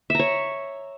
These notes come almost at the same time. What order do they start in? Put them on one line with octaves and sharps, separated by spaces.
E5 A#5 C#5